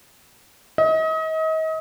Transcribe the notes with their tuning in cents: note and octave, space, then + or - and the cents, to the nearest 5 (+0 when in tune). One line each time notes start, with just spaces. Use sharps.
D#5 +35